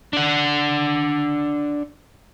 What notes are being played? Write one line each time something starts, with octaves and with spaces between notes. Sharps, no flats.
D4 F#5